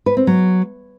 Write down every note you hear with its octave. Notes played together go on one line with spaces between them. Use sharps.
B4
C4
F#3